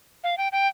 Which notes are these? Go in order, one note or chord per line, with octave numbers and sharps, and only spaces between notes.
F5
G5
G5